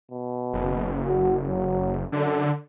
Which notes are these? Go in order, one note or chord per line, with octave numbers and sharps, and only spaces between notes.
B2
F#1
F#4
F#3
F#2 D3